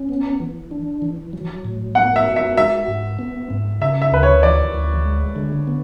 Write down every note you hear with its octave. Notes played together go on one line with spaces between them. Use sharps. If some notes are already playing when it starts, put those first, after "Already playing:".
Already playing: C#4
B3
E3
D4
E3
F#3
A2
B3 F#5
E5
F#4
E5
G#3 E5
G#2
B3
G#2
C#3 E5
E5
D2 B4
C#5
E3 D5
D2
G#3
D3
B3